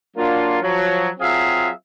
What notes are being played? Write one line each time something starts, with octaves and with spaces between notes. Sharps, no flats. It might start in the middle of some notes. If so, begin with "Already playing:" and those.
F#3 A#3 D4 F4
F3 F#3
F#3 C4 F4 G#4 E5 F5